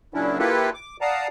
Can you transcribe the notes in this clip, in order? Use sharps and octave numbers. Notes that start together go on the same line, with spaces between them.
A#2 C#3 F#3 C#4 D4 E4
A#3 E4 F4 G4 A4 B4
D6
D5 F5 F#5 A5 A#5 D#6